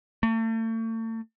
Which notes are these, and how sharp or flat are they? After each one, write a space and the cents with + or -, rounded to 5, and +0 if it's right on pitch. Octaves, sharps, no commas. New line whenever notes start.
A3 +40